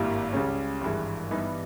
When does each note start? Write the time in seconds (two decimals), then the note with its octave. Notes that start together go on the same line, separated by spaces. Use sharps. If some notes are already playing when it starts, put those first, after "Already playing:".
Already playing: G#1 G2 G3 A#3 E4
0.32 C#2 C#3 G3 C#4
0.81 G#1 G2 E3 G#3
1.31 G2 E3 G3 B3 D#4